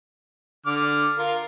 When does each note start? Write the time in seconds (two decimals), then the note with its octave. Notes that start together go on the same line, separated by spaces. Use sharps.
0.66 D3 D6 F6
1.18 F4 A#4